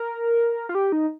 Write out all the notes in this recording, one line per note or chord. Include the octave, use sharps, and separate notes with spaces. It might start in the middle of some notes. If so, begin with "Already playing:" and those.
Already playing: A#4
F4
G4
D#4